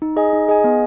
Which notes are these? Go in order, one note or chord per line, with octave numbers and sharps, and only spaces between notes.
D#4
G#4 D#5 G#5
D#4
G#4 D#5 G#5
B3